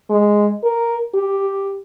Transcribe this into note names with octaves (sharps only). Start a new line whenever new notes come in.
G#3
A#4
G4